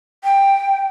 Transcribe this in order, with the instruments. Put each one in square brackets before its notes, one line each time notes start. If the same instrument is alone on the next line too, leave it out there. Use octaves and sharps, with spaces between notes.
[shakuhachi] G5